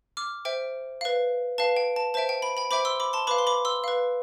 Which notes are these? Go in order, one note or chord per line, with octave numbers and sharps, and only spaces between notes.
D6 F6
C5 E5 G5
B4 F5
B4 F5 A5
G5
A5
C5 E5 G5 A5
G5
G5 B5
G5 B5
C5 E5 G5 B5 D6
C6 E6
B5 D6
A5 C6
B4 F5 B5 D6
C6
B5 D6
C6 E6
B4 F5